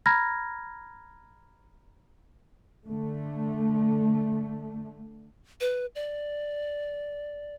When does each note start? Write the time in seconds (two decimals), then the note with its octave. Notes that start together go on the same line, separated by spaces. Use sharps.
0.06 A#5 B5 F6 G#6 A#6
2.85 D3 A3
5.61 B4
5.95 D5